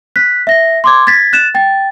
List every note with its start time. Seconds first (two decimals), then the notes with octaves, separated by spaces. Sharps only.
0.16 F#6 B6
0.47 E5 A#6
0.84 C6 D6 G#6
1.07 G#6 A6 B6
1.33 F#6 A6 E7
1.55 G5 A6